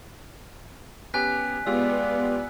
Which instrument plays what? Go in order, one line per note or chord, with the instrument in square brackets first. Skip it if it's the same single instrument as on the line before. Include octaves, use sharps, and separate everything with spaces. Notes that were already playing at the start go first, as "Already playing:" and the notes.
[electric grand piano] B3 C#4 G4 [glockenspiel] G#5 F#6 B6
[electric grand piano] G#3 F4 G4 [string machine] B3 [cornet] D5 [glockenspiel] E6